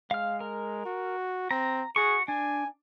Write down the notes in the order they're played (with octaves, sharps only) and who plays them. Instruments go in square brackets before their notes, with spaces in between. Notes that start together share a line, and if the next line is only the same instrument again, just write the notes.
[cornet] G#3 [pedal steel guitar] F5 F6
[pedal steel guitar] A#4
[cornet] F#4
[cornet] C4 [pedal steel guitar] A#5
[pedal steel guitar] F#4 C#6 [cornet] G#4
[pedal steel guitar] D4 [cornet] G#5